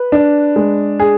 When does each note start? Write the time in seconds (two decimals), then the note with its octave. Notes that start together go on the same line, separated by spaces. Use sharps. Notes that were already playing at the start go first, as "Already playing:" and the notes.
Already playing: B4
0.12 D4
0.56 G#3
0.99 G#4